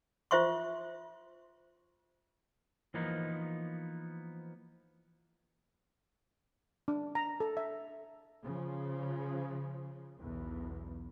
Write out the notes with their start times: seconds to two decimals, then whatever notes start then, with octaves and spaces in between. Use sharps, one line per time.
0.31 F4 C5 E5 C6 C#6
2.94 E3 F3 A#3 B3 D#4
6.88 D4
7.15 A#5
7.40 A4
7.57 E5
8.43 C#3 F3
10.19 B1 E2